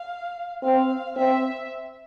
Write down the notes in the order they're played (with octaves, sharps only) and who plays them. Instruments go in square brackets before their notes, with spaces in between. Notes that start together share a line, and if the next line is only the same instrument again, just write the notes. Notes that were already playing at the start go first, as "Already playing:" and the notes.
Already playing: [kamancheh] F5
[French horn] C4 [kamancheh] F5
[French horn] C4 [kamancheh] E5